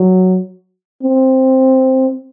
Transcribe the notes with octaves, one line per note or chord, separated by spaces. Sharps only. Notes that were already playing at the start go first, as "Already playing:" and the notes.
Already playing: F#3
C4